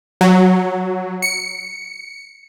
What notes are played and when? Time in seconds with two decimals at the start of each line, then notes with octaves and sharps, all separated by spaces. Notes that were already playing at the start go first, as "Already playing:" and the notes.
0.21 F#3
1.22 C#7